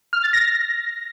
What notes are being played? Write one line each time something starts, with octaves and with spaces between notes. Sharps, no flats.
F6
A6
A#6